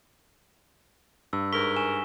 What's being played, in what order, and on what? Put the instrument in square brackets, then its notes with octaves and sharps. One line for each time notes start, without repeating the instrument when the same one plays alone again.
[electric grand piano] G2 [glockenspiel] E6
[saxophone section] G#2 A#4 [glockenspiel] C#6 B6 G7
[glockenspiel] G#5 C#6 E7